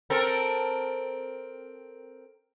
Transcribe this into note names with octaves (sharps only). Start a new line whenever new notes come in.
C4 A4 A#4